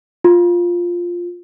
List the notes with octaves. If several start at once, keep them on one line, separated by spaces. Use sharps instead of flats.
F4